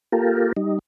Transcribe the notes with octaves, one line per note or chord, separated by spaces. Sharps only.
A#3 F4 G4 A4 A#4
G3 D#4